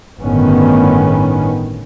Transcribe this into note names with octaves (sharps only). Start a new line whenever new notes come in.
G1 A2 D#3 B3 C#4